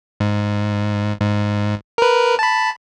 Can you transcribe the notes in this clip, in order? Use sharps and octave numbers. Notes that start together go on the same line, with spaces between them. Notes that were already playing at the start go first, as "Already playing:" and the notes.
G#2
G#2
A#4 B4
A5 B5